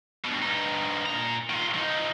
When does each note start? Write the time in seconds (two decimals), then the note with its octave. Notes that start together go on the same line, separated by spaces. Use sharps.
0.25 G2 B2
0.42 G2 D#4
1.06 A#2 A#5
1.50 D#3 F4
1.74 F3 D#4